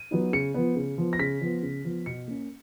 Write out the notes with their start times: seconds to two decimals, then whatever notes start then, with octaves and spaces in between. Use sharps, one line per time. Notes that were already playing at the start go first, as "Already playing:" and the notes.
Already playing: D#7
0.11 F#3 B3 D#4
0.33 C#3 C#7
0.54 F3 B3
0.76 C#3
0.98 F3 B3
1.13 A#6
1.19 C#3 B6
1.41 F3 B3
1.63 C#3
1.85 F3 B3
2.06 B2 C#7
2.28 A#3 C#4